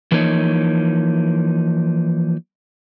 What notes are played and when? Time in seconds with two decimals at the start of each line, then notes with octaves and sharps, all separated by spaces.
0.12 E3 F3 A#3 D#4 C#5